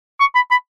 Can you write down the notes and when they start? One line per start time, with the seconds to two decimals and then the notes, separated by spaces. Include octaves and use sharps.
0.20 C#6
0.35 B5
0.51 B5